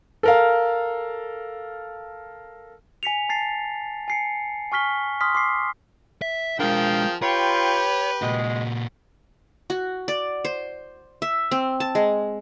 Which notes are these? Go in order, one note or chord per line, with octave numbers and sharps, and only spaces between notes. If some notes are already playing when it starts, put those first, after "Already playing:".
A4 A#4 F5
G#5 B6 C#7 F7
A5 A6 C7
G#5 C7 C#7
G#5 C#6 F6 B6 G7
C6 D#6 F6 B6
C6 D6 C7
E5
F3 G#3 D4 G#4 A#4 F5 G5
F4 G4 B4 C#5 G5
A#2 G#3 F#4
F#4
D5
C5
E5
C4
A5
G#3